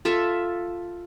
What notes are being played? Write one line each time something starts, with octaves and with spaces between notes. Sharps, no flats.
F4 A4 E5